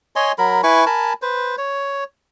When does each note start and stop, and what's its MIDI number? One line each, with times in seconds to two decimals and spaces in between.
0.16 0.32 73
0.16 0.32 75
0.16 0.32 80
0.16 0.32 84
0.38 0.61 54
0.38 0.61 70
0.38 0.61 83
0.63 0.85 64
0.63 0.85 71
0.63 0.85 80
0.63 0.85 85
0.86 1.13 70
0.86 1.13 80
0.86 1.13 81
0.86 1.13 83
1.22 1.56 71
1.22 1.56 72
1.58 2.04 73